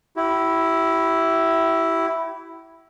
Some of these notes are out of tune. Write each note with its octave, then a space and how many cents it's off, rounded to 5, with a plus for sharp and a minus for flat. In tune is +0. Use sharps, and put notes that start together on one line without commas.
E4 +0 G4 -40